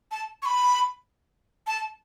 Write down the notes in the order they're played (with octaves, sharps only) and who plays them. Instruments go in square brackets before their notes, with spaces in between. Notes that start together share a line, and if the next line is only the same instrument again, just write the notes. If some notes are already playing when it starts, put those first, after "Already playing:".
[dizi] A5
C#6
B5
A5